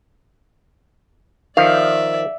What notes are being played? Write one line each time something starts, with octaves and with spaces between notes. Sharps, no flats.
D#3 F3 D5 E5 F5